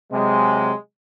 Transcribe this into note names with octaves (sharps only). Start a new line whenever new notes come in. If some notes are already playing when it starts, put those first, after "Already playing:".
C3 F#3 G#3